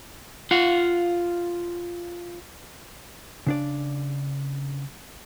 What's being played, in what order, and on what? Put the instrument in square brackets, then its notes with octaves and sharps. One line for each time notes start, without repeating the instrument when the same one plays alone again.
[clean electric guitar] F4 F5 F#5
[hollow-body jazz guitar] C#3 D4 D5